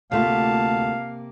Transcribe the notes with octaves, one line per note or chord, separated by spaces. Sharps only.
D2 C3 A3 A#3 F4 F5 A5